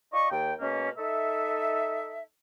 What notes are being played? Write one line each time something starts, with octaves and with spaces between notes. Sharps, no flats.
F4 D5 D#5 C#6
D#2 G5
B2 G#3 A#3 C#4
D#4 A4 E5